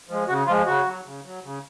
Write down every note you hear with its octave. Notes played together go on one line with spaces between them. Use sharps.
F3 G#3
C#3 F#4
F3 G#3 F4
C#3 F#4
F#3
C#3
F#3
C#3